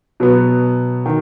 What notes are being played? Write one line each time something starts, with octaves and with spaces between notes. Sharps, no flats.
B2 F#3 B3
D#3